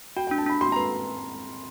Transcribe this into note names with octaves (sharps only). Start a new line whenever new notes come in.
F#4 G5
D4 G5
A5
D4 B5
F#4 C6
B4 A#5